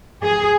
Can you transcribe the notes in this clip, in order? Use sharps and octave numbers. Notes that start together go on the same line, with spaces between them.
G#4